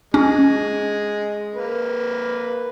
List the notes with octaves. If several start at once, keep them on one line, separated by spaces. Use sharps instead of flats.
G#3 C#4
A#3 B4